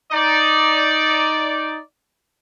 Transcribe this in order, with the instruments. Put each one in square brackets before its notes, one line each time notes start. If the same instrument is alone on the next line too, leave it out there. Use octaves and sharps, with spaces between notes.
[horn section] D#4 D5